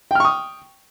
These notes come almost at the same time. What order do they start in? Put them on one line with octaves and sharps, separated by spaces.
G5 F6 C#6 D#6